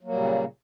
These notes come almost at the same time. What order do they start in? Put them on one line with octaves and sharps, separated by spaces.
F#3 A#3 G3 A#2 C#3